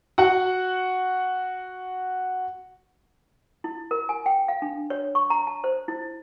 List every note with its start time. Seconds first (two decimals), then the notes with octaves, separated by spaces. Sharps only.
0.18 F#4 F#5
3.64 E4
3.91 A#4
4.09 G#5
4.26 G5
4.48 F5
4.62 D4
4.90 C#5
5.15 C#6
5.30 A#5
5.47 A5
5.64 C5
5.88 E4